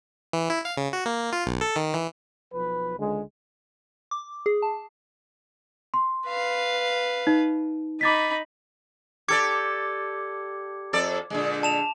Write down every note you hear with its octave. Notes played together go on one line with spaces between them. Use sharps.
E3
E4
F5
C#3
F#4
A#3
F4
B1
A4
D#3
E3
B1 F3 B4
C#2 D3 G#3
D6
G#4
A5
C6
B4 F5
D#4
D#4 B5 D6 A6 B6
G4 A4 D5 D6 G#6 C#7
F2 A4 D5
A#2 D3 G#3
A5 E7 F7